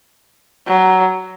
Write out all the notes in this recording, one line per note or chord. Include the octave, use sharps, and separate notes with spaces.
F#3